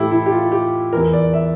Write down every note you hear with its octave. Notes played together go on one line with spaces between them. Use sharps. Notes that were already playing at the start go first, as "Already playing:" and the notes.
Already playing: A2 E3 E4 G4 A4
E4
G4
F4
G4
E2 E3 A#4
D5
E5